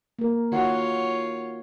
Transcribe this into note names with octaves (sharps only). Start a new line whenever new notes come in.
A#3 A#4
D#3 F4 F#4 C#5 F#5